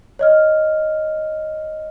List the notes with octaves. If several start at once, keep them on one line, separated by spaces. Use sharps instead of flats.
C#5 D#5 F6